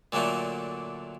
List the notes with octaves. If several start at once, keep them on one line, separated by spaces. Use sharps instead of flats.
A#2 D3 F#3 A3 A#3